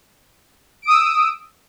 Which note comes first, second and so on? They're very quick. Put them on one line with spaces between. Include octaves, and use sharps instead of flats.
D7 D#6 E6